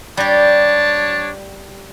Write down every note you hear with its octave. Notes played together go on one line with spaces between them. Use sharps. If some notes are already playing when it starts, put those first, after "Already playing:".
G3 D4 G4 C#5 A5